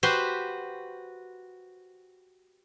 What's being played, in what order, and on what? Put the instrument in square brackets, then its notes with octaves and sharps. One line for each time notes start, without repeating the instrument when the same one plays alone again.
[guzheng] F#4 G4 B4 C5 C6